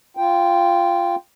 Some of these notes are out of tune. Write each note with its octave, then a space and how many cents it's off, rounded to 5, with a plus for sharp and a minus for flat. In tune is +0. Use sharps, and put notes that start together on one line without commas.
F4 -10 G5 +0